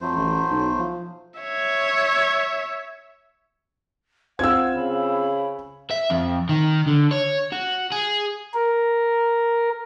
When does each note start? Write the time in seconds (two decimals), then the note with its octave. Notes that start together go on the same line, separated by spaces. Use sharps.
0.01 F2 F#3 A3 C5
0.17 A1
0.51 B1
0.79 F3
1.40 C#5 E5
4.39 C4 F4 F#5 E6 G#6
4.75 C#3 B5
5.91 E5
6.10 F2
6.49 D#3
6.87 D3
7.11 C#5
7.52 F#4
7.92 G#4
8.54 A#4